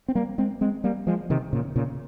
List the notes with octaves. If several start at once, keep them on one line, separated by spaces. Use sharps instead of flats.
C4
G3 A#3
G#3 C4
G#3 C4
G3 A#3
F3 G#3
C3 D#3
A#2 C#3
A#2 C#3